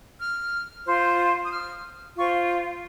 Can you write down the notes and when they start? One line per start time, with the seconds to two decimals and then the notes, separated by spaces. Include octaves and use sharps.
0.19 F6
0.85 F4 C5
1.43 D#6
1.51 F6
2.16 F4 C5 C#6